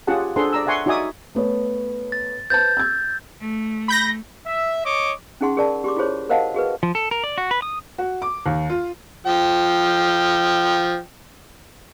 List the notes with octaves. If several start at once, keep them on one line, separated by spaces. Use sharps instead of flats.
C#4 F4 G4 G#4 F#5 A5
D4 G#4 A4 C5 F#5 C6
D5 A#5 E6
D5 E5 F#5 G#5 C6 C#6
D#4 F#4 D5 E5 G#5 D#6
A3 B3 C#5
A6
B4 C5 A5 G6 A6
E6 G#6
A3
B5 G6 A#6
E5
C#5 D#5 C#6 D6
C#4 D#4 G#4 F#5 C6
G#4 A#4 D5 A5
G4 C6 D6
E4 F4 G#4 C5 C#5
A#4 C5 D#5 F5 F#5 A5
F#4 G#4 A#4 B4
F3
A4
A#4
D5
F#4
B4
D#6
F#4
D6
D#2
F4
F3 G5